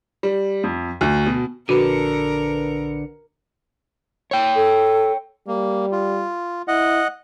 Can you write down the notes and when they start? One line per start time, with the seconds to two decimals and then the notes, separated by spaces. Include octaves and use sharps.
0.23 G3
0.64 F2
1.01 D2
1.26 B2
1.69 A#1 D3 F#4 A#4 B4 C#7
4.31 C#5 G5
4.55 A4
5.47 G3 A#3
5.92 F4
6.68 E4 D#5 F#5